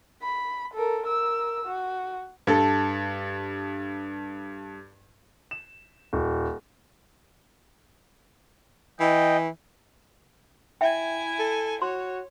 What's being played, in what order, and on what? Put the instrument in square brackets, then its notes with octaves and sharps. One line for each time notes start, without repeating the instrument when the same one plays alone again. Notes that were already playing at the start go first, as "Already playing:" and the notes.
[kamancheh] B5
A4 A#4
A#4 E6
F#4
[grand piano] G2 A4
E7
D#1
[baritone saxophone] E3 [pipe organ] D#5 G5
[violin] E4 G#5 [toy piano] E5 G5
[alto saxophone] A4
[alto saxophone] F#4 [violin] C#5 [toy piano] C6